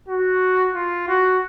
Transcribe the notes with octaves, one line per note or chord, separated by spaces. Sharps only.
F#4
F4
F#4